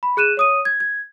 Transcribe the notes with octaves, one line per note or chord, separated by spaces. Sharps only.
B5
G#4 F#6 D#7 E7
C#5 D#6 D#7
G#6
G#6